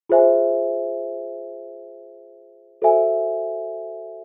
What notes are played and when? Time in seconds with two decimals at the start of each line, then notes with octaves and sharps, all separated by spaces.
0.09 F4 G#4 C5 E5 G#5
2.82 F#4 A4 C5 E5 G#5